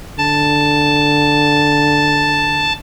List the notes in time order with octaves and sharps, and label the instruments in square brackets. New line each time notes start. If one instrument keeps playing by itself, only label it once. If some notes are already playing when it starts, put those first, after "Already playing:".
[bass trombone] D3 [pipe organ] A5